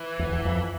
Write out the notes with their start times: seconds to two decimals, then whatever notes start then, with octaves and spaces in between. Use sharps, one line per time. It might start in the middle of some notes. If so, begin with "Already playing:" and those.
Already playing: E3
0.19 E2
0.32 E2
0.45 F2